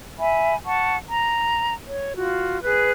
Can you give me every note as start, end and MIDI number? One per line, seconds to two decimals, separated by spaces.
0.18 0.55 76
0.18 0.55 80
0.18 0.55 83
0.65 0.97 78
0.65 0.97 81
0.65 0.97 85
1.08 1.74 82
1.87 2.13 73
2.16 2.60 65
2.16 2.60 66
2.63 2.92 68
2.63 2.92 71
2.63 2.92 90